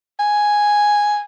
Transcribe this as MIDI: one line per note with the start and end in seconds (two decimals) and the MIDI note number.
0.20 1.21 80